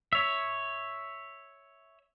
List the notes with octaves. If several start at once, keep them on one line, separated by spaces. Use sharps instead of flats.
C#5 E5